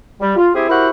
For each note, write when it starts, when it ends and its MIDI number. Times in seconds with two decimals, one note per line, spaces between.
0.20 0.35 55
0.37 0.49 65
0.54 0.67 60
0.54 0.67 64
0.54 0.67 67
0.54 0.67 68
0.69 0.89 64
0.69 0.89 66
0.69 0.89 67
0.69 0.89 70
0.69 0.89 72
0.69 0.89 78